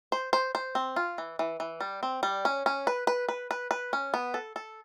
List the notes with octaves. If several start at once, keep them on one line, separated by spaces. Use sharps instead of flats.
C5
C5
C5
C4
F4
E3
E3
E3
G3
C4
G3
C#4
C#4
B4
B4
B4
B4
B4
C#4
B3
A4
A4